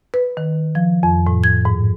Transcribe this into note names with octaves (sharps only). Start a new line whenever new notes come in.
B4
D#3
F3
F2
A2
G#6
G#2